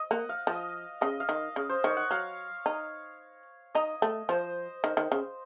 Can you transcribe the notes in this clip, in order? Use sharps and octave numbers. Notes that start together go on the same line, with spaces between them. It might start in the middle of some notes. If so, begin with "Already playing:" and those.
Already playing: D#5
A#3 F#5
F5
F3 D#5
C#3 D#5
F5
D#3
C#3
C5
D#3 C#5
F#5
F#3 F5
D#4
D#4 D#5
A3
F3 C5
D#3
D#3
C#3